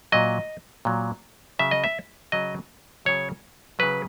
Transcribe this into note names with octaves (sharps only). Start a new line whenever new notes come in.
A#2 F#3 D#5
A#2 F#3
C#3 F#3 E5
D#5
E5
C#3 F#3 D#5
C#3 F#3 C#5
C#3 F#3 B4